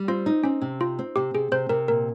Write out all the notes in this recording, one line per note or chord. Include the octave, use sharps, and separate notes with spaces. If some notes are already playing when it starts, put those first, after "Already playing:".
Already playing: G3
C4 F4
D#4
C4 C#4
C3
D#4 F4
C4
C3 G4
C3 G#4
C3 C5
C3 A#4
A#2 A#4